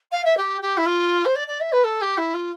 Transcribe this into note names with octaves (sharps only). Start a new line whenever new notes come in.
F5
E5
G4
G4
E4
F4
C5
D5
D5
E5
B4
A4
G4
E4
F4